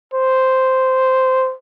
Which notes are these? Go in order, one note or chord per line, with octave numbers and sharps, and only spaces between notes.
C5